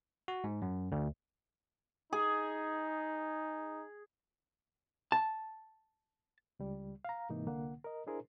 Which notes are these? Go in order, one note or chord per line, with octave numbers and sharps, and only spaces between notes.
F#4
G#2
F#2
D2
D#4 G#4
A5
C#2 G3
F5 A#5
G#2 C3 E3 A#3 D#4
C2 D3 A#3 F#5
A#4 D#5
D4 E4 G#4 A#4 C5